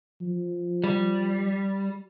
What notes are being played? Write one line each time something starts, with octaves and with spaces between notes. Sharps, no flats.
F3
G3